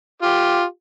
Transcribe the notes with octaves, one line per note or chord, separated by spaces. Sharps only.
F4 G4